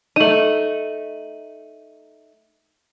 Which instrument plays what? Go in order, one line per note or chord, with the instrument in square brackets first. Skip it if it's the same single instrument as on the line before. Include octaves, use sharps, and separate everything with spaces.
[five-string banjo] A3 D#4 [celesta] D#7 F#7